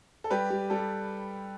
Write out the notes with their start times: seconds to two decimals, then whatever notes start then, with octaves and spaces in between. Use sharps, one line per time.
0.24 A4
0.30 G3 G4 B4
0.50 G3
0.70 G3 A4